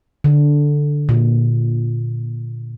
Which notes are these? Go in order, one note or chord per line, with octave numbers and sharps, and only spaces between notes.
D3
A#2